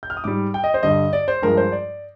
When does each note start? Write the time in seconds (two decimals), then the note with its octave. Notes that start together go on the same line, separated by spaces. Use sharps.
0.03 G6
0.10 F6
0.17 D#6
0.24 G#2 G3 D6
0.54 G5
0.64 D#5
0.74 C5
0.83 G2 D3 G3 D#5
1.13 D5
1.28 C5
1.42 G2 F3 G#3 A#4
1.57 C5
1.72 D5